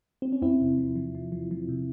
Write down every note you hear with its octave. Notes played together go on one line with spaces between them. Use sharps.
C4
C#4
E2 C4 E4
C3
F3
F3
F3
F3
F3
C3